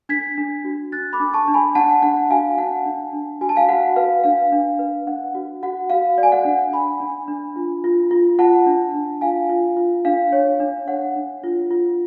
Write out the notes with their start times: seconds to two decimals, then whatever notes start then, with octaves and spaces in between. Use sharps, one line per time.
0.09 D4 G#6 B6
0.38 D4
0.65 F#4
0.92 D4 F#6 A6
1.13 B5 D6
1.20 D4
1.33 A5 C#6
1.48 D4
1.54 G#5 B5
1.75 D4 F#5 A5
2.03 D4 F#5
2.30 F#4 F5 G#5
2.58 D4 F#5 A5
2.86 D4
3.13 D4
3.41 F#4 G#5
3.49 A5
3.56 F5 G#5
3.68 F#4 F#5
3.96 B4 F5
4.24 D4 F5
4.52 D4
4.79 B4
5.07 D4 F#5
5.35 F#4
5.63 F#4 F#5
5.90 F#4 F5
6.18 D5
6.23 G#5
6.32 F#5
6.45 D4
6.73 D4 G#5 B5
7.01 D4
7.28 D4
7.56 F4
7.84 F4
8.11 F4
8.39 F4 F#5 A5
8.66 D4
8.94 D4
9.21 F4 F5 G#5
9.49 F4
9.77 F4
10.05 D4 F5
10.33 C#5
10.60 D4
10.87 C#5 F#5
11.16 D4
11.44 F4
11.71 F4